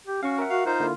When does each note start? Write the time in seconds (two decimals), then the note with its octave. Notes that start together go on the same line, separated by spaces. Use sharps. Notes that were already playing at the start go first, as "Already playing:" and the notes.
0.07 G4
0.23 C#4 F#4 F5 C#6
0.38 A#4 E5 F#5
0.50 F#4 F5
0.66 D#4 F4 C5
0.80 D3 A#3 E4